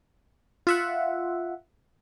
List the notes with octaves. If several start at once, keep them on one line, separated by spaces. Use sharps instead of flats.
F4 E5 F#5